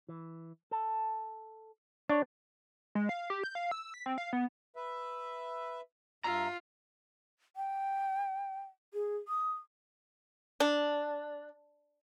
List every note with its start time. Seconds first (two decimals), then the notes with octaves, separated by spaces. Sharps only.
0.09 E3
0.71 A4
2.09 D4 C#5
2.95 G#3
3.09 F5
3.30 G4
3.44 G6
3.55 F5
3.71 E6
3.94 B6
4.06 C4
4.18 F5
4.33 B3
4.76 B4 E5
6.24 G2 F4 E5 A#5
7.56 G5
8.94 G#4
9.28 D#6
10.60 D4